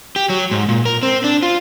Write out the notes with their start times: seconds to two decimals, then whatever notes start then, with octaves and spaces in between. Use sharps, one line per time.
0.16 G4
0.30 F#3
0.51 G#2
0.69 A#2
0.86 A#4
1.03 C4
1.24 D4
1.43 F4